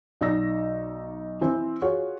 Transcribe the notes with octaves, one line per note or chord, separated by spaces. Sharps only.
B1 D#4 D5 D#5 E6 A#6
E3 C4 C5
F4 F#4 G#4 C#5